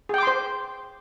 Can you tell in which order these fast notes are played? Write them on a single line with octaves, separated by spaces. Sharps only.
G#4 G5 D6 C6 C5